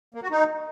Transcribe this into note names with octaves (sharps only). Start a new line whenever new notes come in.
A#3
F#4
D#4